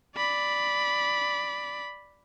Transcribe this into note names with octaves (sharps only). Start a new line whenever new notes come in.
D5 B5